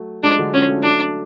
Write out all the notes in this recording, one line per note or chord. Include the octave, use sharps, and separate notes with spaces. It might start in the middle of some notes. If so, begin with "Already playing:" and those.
Already playing: F#3 A3
F3 G#3 D4
D3 F#3
F3 G#3 C#4
F#3 A3
F#3 A3 D4